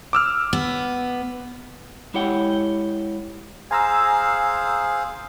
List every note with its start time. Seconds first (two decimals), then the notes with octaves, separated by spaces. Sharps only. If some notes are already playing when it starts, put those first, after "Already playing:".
0.13 D6 E6 F6
0.53 B3
2.14 G#3 E4 G4 C#5 F#5 G5
3.71 G#4 C5 F5 G#5 A#5 E6